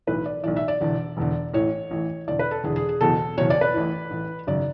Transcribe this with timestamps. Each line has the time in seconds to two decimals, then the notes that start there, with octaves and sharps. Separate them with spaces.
0.07 B1 A2 E3 B4
0.26 D5
0.44 B1 A2 E3 D5
0.56 E5
0.68 D5
0.81 E1 E2 D3
1.17 E1 E2 D3
1.53 A1 A2 E3 C#5
1.91 A1 A2 E3
2.28 E1 E2 D3 D5
2.39 B4
2.51 A4
2.64 E1 E2 D3 G#4
2.76 G#4
2.89 G#4
3.01 F#1 E2 B2 A4
3.37 F#1 E2 B2 C#5
3.50 D5
3.61 B4
3.74 A1 A2 E3
4.11 A1 A2 E3
4.47 G#1 F#2 C#3 D5